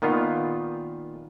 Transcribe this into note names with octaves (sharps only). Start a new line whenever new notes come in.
A#2 D#3 B3 F4